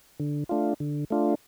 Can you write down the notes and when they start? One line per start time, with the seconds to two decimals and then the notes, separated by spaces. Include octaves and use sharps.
0.20 D3
0.49 A3 D4 F4
0.80 D3
1.10 A3 D4 F4